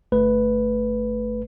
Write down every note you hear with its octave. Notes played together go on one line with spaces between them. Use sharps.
G1 A3 B4